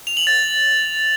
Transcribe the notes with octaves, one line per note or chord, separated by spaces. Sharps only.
F7
F#7
A6